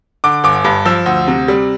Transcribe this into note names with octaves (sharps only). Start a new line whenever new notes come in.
D3 D6
G1 D6
G2
F3 E6
D2
C3
G3